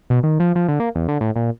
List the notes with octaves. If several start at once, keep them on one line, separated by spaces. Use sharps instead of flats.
B2
D#3
F3
F3
D3
A#3
E2
D3
A2
A#2